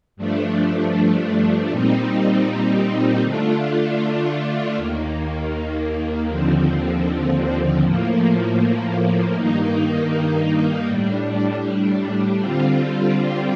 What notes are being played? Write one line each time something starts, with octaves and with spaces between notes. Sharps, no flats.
G2 F3 A3 D4
A#2 G3 C4 D#4
D3 A3 D4 F4
D#2 D#3 A#3
D#2 D3 F3 C4
A2 F3 A#3
G2 D#3 A#3 D#4
A2 G3 D4
D3 G3 C4 F4